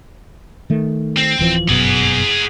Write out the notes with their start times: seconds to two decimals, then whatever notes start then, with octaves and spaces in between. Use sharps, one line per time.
0.70 D#3 A3
1.17 C4
1.39 D1 E3 F3
1.69 G1 F#2 B2 G#4 F#5